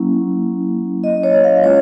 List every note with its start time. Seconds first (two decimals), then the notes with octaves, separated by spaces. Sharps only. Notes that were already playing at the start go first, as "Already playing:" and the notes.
Already playing: F#3 A#3 C#4 E4
1.04 D#5
1.23 C#5
1.44 F5
1.63 G#3 C#4 F4 C#5